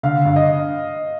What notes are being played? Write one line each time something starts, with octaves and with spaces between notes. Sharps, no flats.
D3 F5
G2
D#5